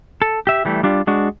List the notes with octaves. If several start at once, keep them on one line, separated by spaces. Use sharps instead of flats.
A4
G4 E5
E3 G3 A3
G3 D4 F4 G4
G#3 D4 F#4